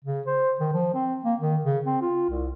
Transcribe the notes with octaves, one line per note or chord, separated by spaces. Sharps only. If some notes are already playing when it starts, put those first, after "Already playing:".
C#3
C5
D#3
F3
C4
A#3
D#3
C#3
C4
F4
C2